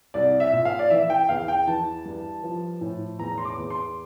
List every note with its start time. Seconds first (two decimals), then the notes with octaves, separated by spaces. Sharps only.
0.14 C2 D5
0.40 E5
0.53 A#2
0.65 F5
0.79 D5
0.90 E3 E5
1.10 G5
1.29 E2 F5
1.48 G5
1.67 E3 A5
2.05 G2
2.43 F3
2.81 A2
3.19 E2 A#5
3.38 C6
3.45 D6
3.58 E2
3.70 C6